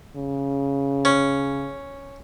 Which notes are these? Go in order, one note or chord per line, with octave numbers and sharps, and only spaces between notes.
C#3
C#4